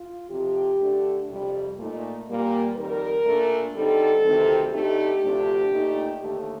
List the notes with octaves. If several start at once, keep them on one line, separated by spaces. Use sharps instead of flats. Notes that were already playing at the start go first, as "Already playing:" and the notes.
Already playing: F4
F2 C3 F3 G4
D3 A3 D4
F2 C3 G3
A#2 A3 D#4
A#2 G3 A#3
F2 D#3 G3 A#4
A#2 A3 D4
D3 G3 C4 D#4 A4
D2 C3 D#3 G3 C4
D3 A3 C4 D#4 G4
D2 C3 F3 A3 D4
A#2 A3 D#4
D#2 D3 A3